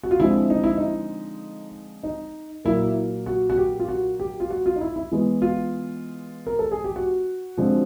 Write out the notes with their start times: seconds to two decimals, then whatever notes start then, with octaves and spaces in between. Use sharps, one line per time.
0.03 F#4
0.11 F4
0.19 D3 F3 G#3 C4 E4
0.50 D#4
0.64 E4
0.78 D#4
2.03 D#4
2.65 A#2 F#3 A#3 E4
3.26 F#4
3.50 F#4
3.57 G4
3.80 F4
3.89 F#4
4.20 G4
4.40 F4
4.50 F#4
4.66 F4
4.76 D#4
4.81 E4
4.96 E4
5.12 E3 G#3 B3
5.42 F4
6.47 A#4
6.59 A4
6.72 G#4
6.84 G4
6.96 F#4
7.57 D3 F3 G#3 C4